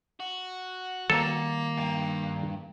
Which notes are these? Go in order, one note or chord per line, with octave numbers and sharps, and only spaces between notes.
F#4
D#3 G3 A#3 A4
D2 G2